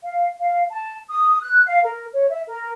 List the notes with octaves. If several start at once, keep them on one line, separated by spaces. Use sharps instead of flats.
F5
F5
A5
D#6
F#6
F5
A#4
C#5
E5
A#4